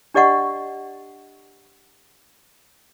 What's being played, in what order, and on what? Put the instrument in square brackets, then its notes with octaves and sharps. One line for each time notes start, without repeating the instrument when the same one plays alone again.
[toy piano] D4 G4 D5 D#5 F#5 C#6